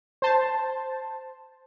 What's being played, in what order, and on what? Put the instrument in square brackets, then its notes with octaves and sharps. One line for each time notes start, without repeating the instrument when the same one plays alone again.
[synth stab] C5 A5